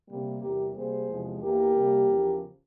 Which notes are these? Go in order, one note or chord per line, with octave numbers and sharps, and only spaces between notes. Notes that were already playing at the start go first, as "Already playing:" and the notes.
C3 G3 A#3
E2 C3 G3 G4 A#4
C3 G3 A#3 G#4 C5
E2 C3 F3 G#3
E2 E3 A#3 G4 A#4
C3 G3 A#3
E2 C#3 F3